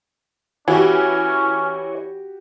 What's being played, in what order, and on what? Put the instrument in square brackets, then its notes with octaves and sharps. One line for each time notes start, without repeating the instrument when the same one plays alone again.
[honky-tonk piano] E3 [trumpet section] C#4 [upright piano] F#4 G4 [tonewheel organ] C#5